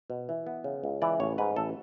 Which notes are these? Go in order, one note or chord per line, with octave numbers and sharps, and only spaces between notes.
B2
E3
B3
C#3
C#2
E3 D5
A1 C#5
G#2 B4
A1 A4